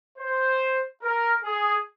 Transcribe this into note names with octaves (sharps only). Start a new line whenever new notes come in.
C5
A#4
G#4